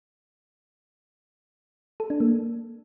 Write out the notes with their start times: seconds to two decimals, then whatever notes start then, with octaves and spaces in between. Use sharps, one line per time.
2.00 A4
2.10 D4
2.20 A#3